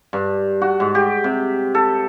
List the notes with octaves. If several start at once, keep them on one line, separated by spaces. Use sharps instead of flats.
G2
F#4
G#2
G4
C3
A4